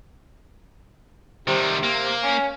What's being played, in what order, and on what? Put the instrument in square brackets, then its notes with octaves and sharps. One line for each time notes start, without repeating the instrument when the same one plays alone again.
[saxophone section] C3 [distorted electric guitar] D#3 G3
[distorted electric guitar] A#3
[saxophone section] C#4